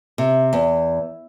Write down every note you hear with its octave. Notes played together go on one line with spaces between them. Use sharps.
C3
E2